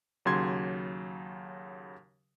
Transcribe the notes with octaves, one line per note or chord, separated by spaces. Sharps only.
D#2 C#3 F#3 C6 G#6